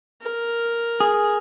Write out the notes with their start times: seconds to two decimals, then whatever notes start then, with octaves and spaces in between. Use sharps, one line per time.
0.21 A#4
1.00 G#4